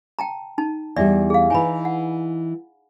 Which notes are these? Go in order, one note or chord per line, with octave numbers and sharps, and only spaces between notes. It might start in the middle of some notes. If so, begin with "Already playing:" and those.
G5 A5 A#5
D#4 A5
E2 G3 D5 E5
G#4 F5
E3 D#4 G#5 A#5 B5
F#5